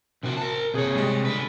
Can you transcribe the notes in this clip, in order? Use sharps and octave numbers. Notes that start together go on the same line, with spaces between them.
C3 D#3 F#4
A#4 A5
G1 C3 G#4 C#5
G3 G#3
D3 B4